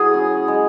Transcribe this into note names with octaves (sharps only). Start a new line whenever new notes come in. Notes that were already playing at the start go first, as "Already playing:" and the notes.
Already playing: F#3 E4 G#4
C#4
G#3